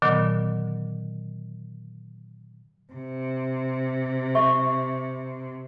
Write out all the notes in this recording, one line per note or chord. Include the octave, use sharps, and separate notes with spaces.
A#2 D3 D#3 F#3 B3
C3
E5 C#6